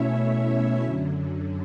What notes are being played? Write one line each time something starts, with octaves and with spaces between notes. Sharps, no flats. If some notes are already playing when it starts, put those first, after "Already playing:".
Already playing: B2 A3 C#4 E4 C#5 E5
F#2 D3 F#3